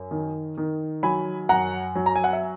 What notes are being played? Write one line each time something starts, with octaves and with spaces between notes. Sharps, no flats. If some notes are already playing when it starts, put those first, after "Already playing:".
Already playing: F#2
D#3
D#3
F#3 G#5 B5
F#2 F#5 A#5
F#3
A#5
G#5
F#5
E5